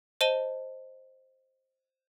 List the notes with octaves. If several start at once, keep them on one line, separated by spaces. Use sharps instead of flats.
C5 D#5 A5 D#7 G7